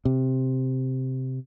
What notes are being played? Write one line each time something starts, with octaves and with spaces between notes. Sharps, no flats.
C3